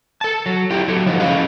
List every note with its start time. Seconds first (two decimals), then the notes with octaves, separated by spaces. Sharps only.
0.21 A4 A5
0.46 F#3
0.70 E4 F4 G4
0.88 F#3 A4
1.06 F3 D#4 F4 F#4
1.20 C#4 E4 G#4 D#5 F5